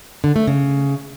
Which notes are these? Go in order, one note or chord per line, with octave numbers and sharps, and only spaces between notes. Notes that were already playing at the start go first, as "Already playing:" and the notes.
D3
A3
C#3